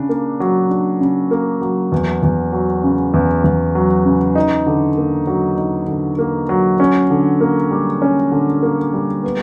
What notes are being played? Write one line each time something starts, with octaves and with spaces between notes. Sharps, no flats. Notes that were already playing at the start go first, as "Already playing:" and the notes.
Already playing: C#3 D4
A#3
F#3
D4
C#3
A#3
F#3
E2
E2
F#3
C#3
E2
E2
F#3
C#3
D#4
D3
A#3
F#3
D#4
D3
A#3
F#3
C#4
D3
A#3
G3
C#4
D3
A#3
G3
B3